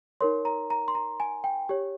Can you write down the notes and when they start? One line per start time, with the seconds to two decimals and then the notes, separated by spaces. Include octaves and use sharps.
0.21 D#4 A#4 C#5 C6
0.45 A#5
0.70 A#5
0.88 C6
0.95 A#5
1.20 G#5
1.44 G5
1.69 G4 C#5